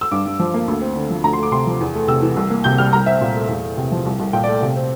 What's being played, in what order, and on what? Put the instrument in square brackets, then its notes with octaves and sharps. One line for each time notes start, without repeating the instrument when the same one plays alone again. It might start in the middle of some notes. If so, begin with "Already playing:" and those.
[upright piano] E6
G2 D6
G2
F3
A#3
D2
C4
D3
F3
D2 A#5
C6
A3 D6
C3 C6
F3
E2
A3
C3 E6
E3
C2
A#3
C3 G6
G3 F6
C2 A#5
C4 E5
A#2
A3
E2
A3
C3
F3
C2
C2
A#2 G5
D5
A3
C3
C4